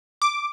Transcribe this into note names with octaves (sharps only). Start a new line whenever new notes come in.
D6